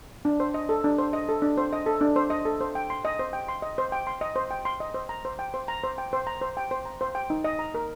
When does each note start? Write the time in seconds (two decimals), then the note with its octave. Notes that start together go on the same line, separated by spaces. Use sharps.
0.25 D4
0.40 C5
0.54 D#5
0.69 A4
0.84 D4
0.98 C5
1.13 D#5
1.29 A4
1.42 D4
1.58 C5
1.73 D#5
1.86 A4
2.01 D4
2.16 C5
2.30 D#5
2.45 A4
2.61 C5
2.75 G5
2.90 C6
3.05 D#5
3.19 C5
3.33 G5
3.48 C6
3.62 D#5
3.78 C5
3.92 G5
4.07 C6
4.21 D#5
4.36 C5
4.51 G5
4.65 C6
4.80 D#5
4.94 C5
5.09 A#5
5.25 C5
5.39 G5
5.54 C5
5.68 A#5
5.84 C5
5.98 G5
6.13 C5
6.27 A#5
6.41 C5
6.57 G5
6.71 C5
6.85 A#5
7.01 C5
7.15 G5
7.30 D#4
7.44 D#5
7.59 A#5
7.75 A#4